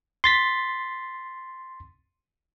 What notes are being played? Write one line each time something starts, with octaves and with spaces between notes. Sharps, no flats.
C6 A6 B6